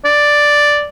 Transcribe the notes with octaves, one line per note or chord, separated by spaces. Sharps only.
D5